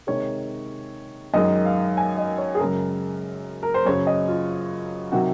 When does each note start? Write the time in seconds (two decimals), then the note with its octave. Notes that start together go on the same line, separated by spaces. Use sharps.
0.07 C3 D#3 G#3 C#5
1.34 F#2 D#3 G#3 D#5
1.65 F5
1.97 G#5
2.18 D#5
2.38 C#5
2.55 G#4
2.59 F#2 C#3 G#3 A#4
3.63 A#4
3.74 C5
3.85 F#2 C#3 F#3 C#5
4.07 D#5
4.28 F4
5.12 C3 D#3 F#3 F#4